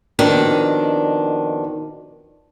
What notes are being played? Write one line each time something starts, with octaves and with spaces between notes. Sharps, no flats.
F2 B2 D#3 D4